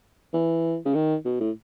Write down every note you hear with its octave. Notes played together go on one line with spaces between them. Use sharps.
E3
C#3
D#3
B2
A2